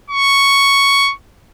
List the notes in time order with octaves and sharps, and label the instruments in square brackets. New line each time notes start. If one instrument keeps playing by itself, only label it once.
[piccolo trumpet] C#6